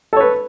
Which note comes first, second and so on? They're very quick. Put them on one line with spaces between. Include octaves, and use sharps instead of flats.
A4 C#5 B4